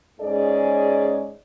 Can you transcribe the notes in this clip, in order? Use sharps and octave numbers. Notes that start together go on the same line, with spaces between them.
G#2 C#4 G#4 D5 D#5